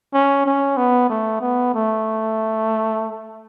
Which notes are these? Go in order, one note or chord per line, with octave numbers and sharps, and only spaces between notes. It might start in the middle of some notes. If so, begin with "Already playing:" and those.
C#4
C#4
B3
A3
B3
A3